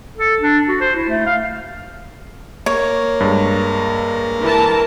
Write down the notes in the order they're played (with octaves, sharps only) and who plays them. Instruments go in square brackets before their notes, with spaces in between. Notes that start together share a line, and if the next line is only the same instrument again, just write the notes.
[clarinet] A4
D4
F#4
C5
E4
A3
F5
[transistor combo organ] A#3 [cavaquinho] C#5
[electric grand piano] G2 G#3
[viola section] E3 A#4 A5